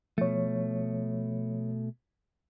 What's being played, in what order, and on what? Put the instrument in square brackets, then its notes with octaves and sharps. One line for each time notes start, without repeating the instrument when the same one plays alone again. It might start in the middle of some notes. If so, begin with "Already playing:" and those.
[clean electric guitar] B2 A3 [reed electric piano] F3 C#5